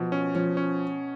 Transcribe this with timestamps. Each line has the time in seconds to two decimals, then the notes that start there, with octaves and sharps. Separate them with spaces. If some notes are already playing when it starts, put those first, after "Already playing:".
Already playing: B2 F3
0.12 C#4
0.35 F3 C#4
0.57 C#4